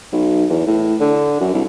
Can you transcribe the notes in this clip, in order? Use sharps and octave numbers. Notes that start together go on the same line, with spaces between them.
B1
E2
A2
D3
F#2
C2